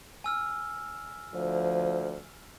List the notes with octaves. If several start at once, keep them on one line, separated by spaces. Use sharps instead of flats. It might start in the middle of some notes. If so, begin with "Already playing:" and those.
G#5 E6 F6
D2 F3